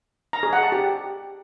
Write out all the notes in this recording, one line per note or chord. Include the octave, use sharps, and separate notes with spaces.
A#5
G#4
F#5
A5
G4